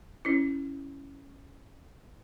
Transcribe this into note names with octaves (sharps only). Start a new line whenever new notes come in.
C#4 E4